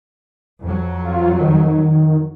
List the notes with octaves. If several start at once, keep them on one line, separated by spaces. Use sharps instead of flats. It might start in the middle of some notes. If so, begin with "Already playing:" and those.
F2 F#3
F4
D#3